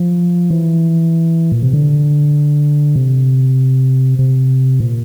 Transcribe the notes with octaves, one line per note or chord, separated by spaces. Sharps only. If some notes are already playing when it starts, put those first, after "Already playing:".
Already playing: F3
E3
A#2
C3
D3
C3
C3
A#2